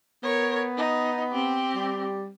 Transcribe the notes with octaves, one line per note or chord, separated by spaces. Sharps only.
B3 A#4 C#5
D#4
C4 G4
G3